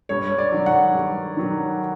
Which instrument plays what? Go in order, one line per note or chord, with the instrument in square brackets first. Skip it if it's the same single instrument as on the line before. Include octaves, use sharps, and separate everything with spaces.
[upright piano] G2 C#5
D5
D#3 F#3
F#5
G2
D#3 F#3